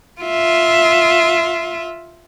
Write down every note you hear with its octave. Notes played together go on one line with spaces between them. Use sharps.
F4 E5